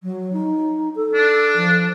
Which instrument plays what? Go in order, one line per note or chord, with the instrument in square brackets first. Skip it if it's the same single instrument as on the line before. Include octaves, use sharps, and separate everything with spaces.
[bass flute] F#3
D#4
A4
[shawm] D4
[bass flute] F3